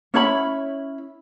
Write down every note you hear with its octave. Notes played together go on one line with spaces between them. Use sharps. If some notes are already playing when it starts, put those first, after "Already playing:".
C#4 E4 C#5 B5